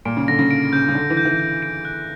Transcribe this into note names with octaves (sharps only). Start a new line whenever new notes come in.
A#2 D7
C#3
D3 A#6
C#3
D7
C#3 G6
C#3
D3 G6
E3
G6
E3
G6
D7
F#6